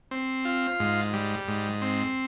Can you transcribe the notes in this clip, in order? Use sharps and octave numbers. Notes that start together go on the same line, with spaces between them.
C4
F4
G#2
G3
G#2
C4